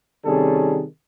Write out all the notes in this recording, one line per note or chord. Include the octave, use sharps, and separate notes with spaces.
C3 D#3 G3 C#4 G#4 A4